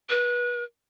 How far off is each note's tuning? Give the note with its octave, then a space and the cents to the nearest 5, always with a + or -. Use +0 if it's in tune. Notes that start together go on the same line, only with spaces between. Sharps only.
B4 -30